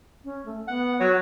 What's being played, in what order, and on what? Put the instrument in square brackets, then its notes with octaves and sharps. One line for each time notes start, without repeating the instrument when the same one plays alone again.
[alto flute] C#4
A3
[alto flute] B3 [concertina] F#5
[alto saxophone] F#3 [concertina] F#4 C#5